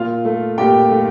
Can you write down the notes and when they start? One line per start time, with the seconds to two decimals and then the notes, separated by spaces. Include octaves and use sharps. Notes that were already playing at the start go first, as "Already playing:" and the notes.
Already playing: A#2 F4 F5
0.25 A3
0.58 A#2 G4 G5
0.90 A3